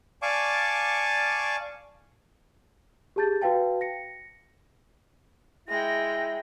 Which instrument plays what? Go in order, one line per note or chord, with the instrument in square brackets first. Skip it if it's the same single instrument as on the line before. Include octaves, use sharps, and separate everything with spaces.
[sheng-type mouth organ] D5 F5 G#5 A5 C#6 D6
[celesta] G4 G#4 A5 G6 A6
F#4 B4 F5 G5 A5
A#6 C#7
[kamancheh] G#3 G5 [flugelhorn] E4 [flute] A#6